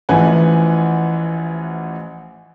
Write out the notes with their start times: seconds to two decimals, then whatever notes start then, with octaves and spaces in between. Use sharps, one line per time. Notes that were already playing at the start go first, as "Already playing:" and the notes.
0.09 A1 E3 F3 B4 F#5 G#5